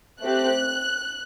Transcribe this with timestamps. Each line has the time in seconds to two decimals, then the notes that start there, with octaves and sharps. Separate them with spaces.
0.21 A3 C4 G4 F#6